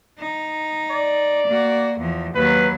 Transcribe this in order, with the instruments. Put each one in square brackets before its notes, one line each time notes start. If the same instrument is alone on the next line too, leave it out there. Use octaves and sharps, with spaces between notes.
[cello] D#4
[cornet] D5
[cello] A#3 F#4
E2 F3
[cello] D#2 F#3 [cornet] B4